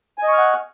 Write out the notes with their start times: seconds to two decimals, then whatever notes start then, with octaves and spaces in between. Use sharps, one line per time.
0.18 G#5
0.23 D#5
0.28 C#6
0.33 F6
0.38 F#5